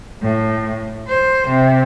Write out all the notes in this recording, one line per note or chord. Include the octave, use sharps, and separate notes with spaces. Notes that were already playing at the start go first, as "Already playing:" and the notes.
A2
C5
C3